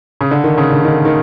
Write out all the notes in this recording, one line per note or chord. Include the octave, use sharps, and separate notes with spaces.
C#3
D3
D#3
C#3
D3
D#3
D#3